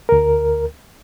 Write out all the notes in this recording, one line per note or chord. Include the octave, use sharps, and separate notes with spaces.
D2 A#4